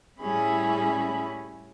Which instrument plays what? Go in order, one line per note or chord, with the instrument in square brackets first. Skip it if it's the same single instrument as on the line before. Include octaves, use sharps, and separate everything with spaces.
[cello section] A2 G3 C#4 [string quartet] E4 G#4 B5